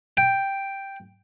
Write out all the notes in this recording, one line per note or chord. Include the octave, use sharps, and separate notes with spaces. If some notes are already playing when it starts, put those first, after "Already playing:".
G5